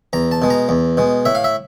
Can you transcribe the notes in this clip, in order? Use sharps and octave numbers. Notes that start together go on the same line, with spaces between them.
E2 A#5
A5
B2 G#3
A#5
E2
B2 G#3
A2 E5
F5
E5